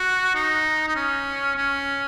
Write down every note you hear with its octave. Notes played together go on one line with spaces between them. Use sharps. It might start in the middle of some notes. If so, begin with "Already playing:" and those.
Already playing: F#4
D#4
D#4
C#4
C#4